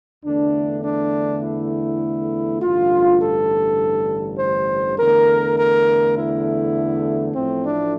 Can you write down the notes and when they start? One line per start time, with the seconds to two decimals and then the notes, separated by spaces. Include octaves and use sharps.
0.25 E2 D3 A3 D4
0.84 D4
1.43 E4
2.62 A1 G2 D3 F4
3.21 A4
4.39 C5
4.98 E2 D3 A3 A#4
5.58 A#4
6.17 E4
7.35 A1 A2 F3 A3 C4
7.64 D4